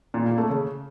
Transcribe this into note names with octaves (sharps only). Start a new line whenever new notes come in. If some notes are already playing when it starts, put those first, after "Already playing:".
A#2
A#3
A3
C#3